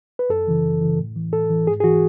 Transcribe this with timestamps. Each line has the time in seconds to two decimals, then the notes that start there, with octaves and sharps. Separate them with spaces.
0.19 B4
0.30 F#2 A4
0.47 C#3 E3
0.65 F#2
0.81 C#3 E3
0.99 A2
1.16 E3
1.33 A2 A4
1.50 E3
1.67 G#2 G#4
1.80 G#4
1.84 E3 F#4